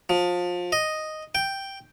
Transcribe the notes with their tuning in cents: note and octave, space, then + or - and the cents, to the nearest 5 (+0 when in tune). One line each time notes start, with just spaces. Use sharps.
F3 +25
D#5 +0
G5 +0